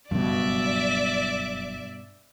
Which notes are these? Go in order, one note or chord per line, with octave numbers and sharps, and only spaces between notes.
F#1 G2 B2 F#3 D5 E5